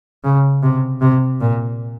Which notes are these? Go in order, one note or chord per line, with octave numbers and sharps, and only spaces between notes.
C#3
C3
C3
A#2